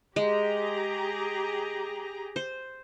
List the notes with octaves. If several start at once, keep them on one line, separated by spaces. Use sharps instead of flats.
G#3 G4 G#4 A#5
C5